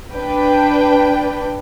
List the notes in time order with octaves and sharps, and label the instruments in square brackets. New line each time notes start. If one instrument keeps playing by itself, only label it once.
[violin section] D4 B4 G5